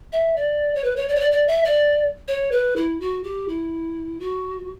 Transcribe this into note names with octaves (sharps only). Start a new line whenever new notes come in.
E5
D5
C#5
B4
C#5
D5
C#5
D5
D5
E5
D5
C#5
B4
E4
F#4
G4
E4
F#4